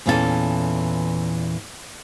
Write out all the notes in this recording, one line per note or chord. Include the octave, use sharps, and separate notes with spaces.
E2 A#2 E3 C#4 F4 A4